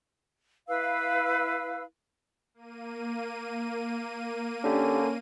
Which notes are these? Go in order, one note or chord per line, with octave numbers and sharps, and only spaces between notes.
E4 B4 F5 E6
A#3 D#7
D3 C#4 D4 G4